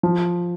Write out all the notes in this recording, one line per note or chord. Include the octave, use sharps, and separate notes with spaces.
F3